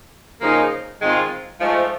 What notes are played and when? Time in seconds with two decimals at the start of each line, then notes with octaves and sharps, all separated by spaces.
0.40 C#3 F3 A#3 D#4 G#4
1.00 G#2 D#3 G#3 C4 F4
1.60 G#2 F3 A3